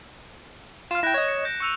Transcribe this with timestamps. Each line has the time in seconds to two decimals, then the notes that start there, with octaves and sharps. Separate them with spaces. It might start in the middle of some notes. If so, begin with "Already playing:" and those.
0.91 F4 F5 E7
1.03 E4 G5 F#6 A#6
1.14 C#5 D#5
1.28 C#7
1.45 G6 A#6 D7
1.60 C#6 E6 C#7 D#7 F7